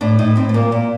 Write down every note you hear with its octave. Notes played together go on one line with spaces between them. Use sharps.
A2 D4
A2 D#4
A2 C4
A3
A#2 A#3
A#2